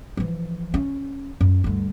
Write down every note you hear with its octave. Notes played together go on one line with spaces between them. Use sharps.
E3 F3
C#4
F#2
D2 G2